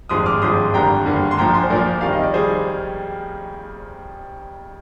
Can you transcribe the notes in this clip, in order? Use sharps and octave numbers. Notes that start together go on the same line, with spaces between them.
G#1 G2 F3 G#3 C6 D#6
D6 F6
G#1 G2 F3 G#3 C6 D#6
G#1 G2 D3 G3 A#3 G5 A#5
G#1 G2 D3 G3 A#3
C6
A#1 A#2 F3 G5 A#5
G#5 C6
C5
A#1 A#2 F3 A#4 D5
F2 D#3 G3 F5
D#5
D5
D#3 G3 G#4 C5